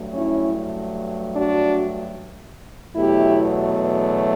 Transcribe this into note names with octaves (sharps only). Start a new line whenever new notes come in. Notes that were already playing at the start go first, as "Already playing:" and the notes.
Already playing: G2 F#3 A3
C#4 E4
D4 F#4
E2 B2 F#3 A3 E4 G4